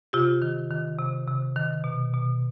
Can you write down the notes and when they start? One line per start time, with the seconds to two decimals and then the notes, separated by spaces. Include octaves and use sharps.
0.13 C3 F4 G4
0.42 D#3
0.71 D#3
0.98 C3
1.27 C3
1.56 D#3
1.84 B2
2.13 B2